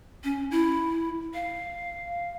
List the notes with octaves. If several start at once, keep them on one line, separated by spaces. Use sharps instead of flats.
C#4
E4
F5